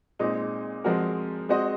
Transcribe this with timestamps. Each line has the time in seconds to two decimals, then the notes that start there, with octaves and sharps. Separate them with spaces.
0.19 A#2 G#3 C4 D#4
0.84 F3 G#3 C4 F#4 A#4
1.49 G#3 C4 F#4 C5 D#5